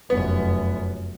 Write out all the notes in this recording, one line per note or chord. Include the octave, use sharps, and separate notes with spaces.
F1 F#2 B3